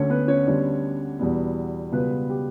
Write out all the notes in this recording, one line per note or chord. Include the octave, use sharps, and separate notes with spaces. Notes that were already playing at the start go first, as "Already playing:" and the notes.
Already playing: D2 D3 A3 C#4 C#5
B3 B4
C#4 C#5
D2 D3 G3 B3 D4
E2 B2 G3 B3
C#2 B2 G3 B3 B4
G4